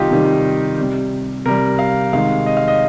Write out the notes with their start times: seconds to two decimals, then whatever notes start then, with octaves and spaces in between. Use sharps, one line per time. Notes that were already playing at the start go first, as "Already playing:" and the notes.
Already playing: C3 D#3 G3 D#4 F4 G4
0.10 C3 D#3 G3
0.78 C3 G3
1.45 C3 G3 A#4
1.79 F5
2.13 C3 D#3 G#3 F5
2.46 D#5
2.57 F5
2.68 D#5